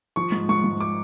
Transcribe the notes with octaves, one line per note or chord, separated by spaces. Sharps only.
F3 C#6
G#2
G#2 C#6
G#2
D6